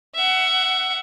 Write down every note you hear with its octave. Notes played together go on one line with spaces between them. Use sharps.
E5 F#5